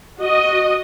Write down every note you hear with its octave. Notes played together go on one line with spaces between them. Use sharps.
F#4 D#5